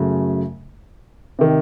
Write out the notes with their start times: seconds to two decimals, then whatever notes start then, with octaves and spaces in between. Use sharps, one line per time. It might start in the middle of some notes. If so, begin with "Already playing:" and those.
Already playing: F#2 C#3 F#3 A3
1.39 C3 D#3